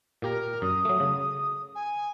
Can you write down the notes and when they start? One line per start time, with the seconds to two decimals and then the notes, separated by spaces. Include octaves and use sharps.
0.22 A#2 G4 A#4 A#5
0.62 F#2 D#6
0.85 F#3 A3
1.00 C#3
1.75 G#5